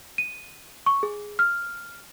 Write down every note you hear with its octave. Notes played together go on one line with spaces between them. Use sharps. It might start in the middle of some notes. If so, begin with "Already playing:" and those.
D#7
C#6
G#4
F6